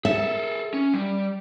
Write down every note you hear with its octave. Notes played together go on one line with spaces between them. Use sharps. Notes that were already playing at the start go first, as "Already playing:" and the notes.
G#4 A4 E5
C#4
G3